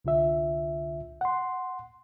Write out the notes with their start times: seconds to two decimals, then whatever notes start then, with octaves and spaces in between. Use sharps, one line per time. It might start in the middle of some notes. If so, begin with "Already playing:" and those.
0.05 C2 D3 F4 E5
1.21 F#5 C6